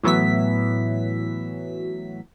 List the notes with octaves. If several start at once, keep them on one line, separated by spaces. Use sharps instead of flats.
A2 E3 F#3 B3 E5 B6